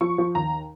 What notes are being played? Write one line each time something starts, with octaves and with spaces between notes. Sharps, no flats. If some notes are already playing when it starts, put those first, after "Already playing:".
F3 C#6
F3
D#2 A#5